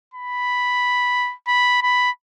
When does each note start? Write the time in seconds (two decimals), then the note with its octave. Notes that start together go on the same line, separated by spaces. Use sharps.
0.14 B5
1.48 B5
1.82 B5